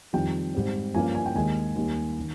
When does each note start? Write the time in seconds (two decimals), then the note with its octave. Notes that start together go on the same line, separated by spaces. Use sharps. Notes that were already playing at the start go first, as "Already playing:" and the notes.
0.13 F2 D#3 G3 G5
0.55 G#2 G3 C4
0.95 G2 F3 A#3 C#4 G#5
1.15 G#5
1.26 G5
1.35 D#2 D#3 G#3 G#5
1.76 D#2 D#3 G3
2.19 D#3